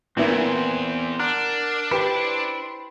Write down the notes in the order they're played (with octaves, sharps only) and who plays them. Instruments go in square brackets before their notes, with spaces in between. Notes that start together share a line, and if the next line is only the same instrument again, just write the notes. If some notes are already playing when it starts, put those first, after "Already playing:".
[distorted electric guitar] E2 [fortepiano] A#2 B3 E4 [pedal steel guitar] C4 C5
[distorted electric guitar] D4 [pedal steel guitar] A#4 D5 F#5
[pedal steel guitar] E4 C5 D6 [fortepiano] G4 B4